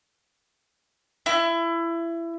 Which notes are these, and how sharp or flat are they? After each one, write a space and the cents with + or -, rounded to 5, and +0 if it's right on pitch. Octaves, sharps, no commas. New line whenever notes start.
E4 +25